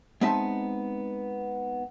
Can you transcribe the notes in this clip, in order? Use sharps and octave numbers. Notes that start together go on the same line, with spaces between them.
G#3 B3 C4 D#4 E5 A5